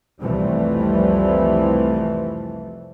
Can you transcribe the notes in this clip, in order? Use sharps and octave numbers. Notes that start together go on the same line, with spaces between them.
C2 F2 E3 F3 G3 A3